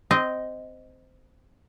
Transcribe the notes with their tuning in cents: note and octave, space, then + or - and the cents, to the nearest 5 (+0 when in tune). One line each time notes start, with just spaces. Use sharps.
C4 -15 D#5 +0